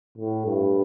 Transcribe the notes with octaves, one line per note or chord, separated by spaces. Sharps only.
A2
G2